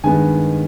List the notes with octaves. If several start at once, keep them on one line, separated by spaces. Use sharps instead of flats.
G2 D#3 G#3 B3 G#5